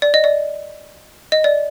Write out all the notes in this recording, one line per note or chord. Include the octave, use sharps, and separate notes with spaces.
D5
D#5
D5
D#5
D5